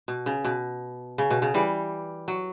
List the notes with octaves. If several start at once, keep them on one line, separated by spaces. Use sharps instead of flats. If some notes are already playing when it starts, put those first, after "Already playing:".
B2
C#3
B2
C#3
B2
C#3
E3 G3
F#3